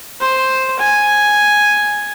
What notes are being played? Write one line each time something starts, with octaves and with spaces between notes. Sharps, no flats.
C5
G#5